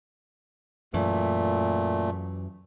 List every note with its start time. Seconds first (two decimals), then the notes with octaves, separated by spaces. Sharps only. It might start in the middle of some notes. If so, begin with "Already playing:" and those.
0.94 F#2 A#2 E3 A3